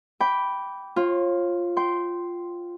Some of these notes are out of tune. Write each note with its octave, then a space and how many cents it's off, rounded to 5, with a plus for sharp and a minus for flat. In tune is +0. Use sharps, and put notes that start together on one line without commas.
G5 +0 B5 +0 D6 -20
F4 +0 C#5 -40
G5 -15 C6 +0